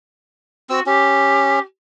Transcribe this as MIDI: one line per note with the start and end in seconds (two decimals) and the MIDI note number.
0.70 0.80 60
0.70 0.83 66
0.70 0.80 88
0.86 1.59 61
0.86 1.60 67